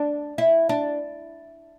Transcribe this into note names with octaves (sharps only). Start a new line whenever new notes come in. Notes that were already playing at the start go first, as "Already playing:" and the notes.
Already playing: D4
E4
D4